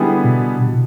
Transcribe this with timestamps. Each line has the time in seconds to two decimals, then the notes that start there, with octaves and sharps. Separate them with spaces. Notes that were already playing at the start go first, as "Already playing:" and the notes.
Already playing: D3 G3 B3 E4 G#4
0.24 B2
0.67 B2